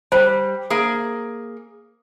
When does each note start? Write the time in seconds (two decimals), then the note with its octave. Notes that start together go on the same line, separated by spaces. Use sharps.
0.12 G3 C5
0.70 A#3 G#4